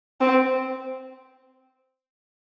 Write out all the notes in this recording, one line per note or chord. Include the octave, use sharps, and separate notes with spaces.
C4